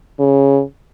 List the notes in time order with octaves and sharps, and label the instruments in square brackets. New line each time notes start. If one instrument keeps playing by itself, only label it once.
[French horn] C#3